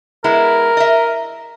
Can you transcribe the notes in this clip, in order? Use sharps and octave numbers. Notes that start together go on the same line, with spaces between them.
G#3 B3 E4 A#4
D#5 E5